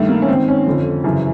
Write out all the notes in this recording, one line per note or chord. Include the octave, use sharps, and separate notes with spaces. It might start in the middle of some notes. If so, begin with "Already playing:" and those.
Already playing: G2 D#3 A3
A#3
C#4
G#2 D#3 C4
C#4
F2 D3 F3
F#2 C#3 E3